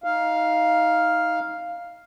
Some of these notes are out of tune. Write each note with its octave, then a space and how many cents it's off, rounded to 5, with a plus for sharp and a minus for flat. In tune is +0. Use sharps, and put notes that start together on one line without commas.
D#4 +20 F5 +0